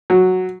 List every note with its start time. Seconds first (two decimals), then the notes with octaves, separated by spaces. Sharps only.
0.10 F#3